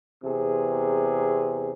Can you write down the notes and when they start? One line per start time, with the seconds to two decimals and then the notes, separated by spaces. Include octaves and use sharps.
0.24 E2 C3 G#4